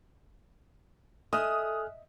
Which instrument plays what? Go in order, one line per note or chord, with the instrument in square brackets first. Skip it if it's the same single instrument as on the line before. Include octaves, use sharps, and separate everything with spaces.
[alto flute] A4 [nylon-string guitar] D#5 E5 [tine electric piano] G#5 F6 F#6 [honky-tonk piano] D#6